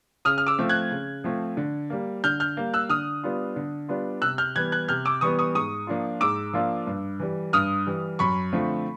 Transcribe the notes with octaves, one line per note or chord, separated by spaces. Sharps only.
C#3 D#6 F6
F6
D6 E6
F3 A3 C4
F#6 G#6
C#3
F3 A3 C4
D3
G3 A#3
D3 F6 G6
F6 G6
G3 A#3
E6 F#6
D3 D#6 F6
G3 B3 D4 F4
D3
G3 B3 D4 F4
C3 E6 F#6
F6 G6
E3 G3 B3 F#6 G#6
F#6 G#6
C3 F6 G6
D6 E6
E3 G3 B3 C#6 D#6
C#6 D#6
G#2 C#6 D#6
F3 A#3 D4 F4
G#2 D6 E6
F3 A#3 D4 F4
G2
E3 G3
G2 D#6 F6
E3 G3
F#2 B5 C#6
D3 F3 A3 C4